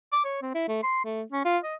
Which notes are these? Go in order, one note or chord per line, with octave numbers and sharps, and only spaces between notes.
D6
C#5
C4
E4
A3
C6
A3
C#4
F4
D#5